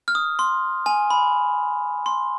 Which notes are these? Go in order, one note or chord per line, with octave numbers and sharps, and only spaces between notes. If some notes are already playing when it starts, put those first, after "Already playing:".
F6
D#6
C6
G#5
B5
C6